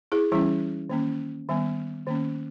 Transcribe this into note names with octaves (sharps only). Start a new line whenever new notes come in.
E4 G#4
E3 G3 C#4 E4
D#3 A#3 C#4
D#3 G3 B3
D#3 A#3 C#4